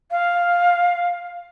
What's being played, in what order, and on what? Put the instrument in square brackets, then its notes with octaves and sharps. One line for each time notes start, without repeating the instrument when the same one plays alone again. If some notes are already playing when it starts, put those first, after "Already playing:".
[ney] F5